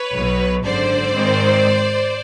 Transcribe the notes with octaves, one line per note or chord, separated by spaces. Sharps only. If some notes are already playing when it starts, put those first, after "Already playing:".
Already playing: B4 C#5
B1 B2 F#3
G#1 F#2 D3 C5 D5
G#2 D#3 G#3 C4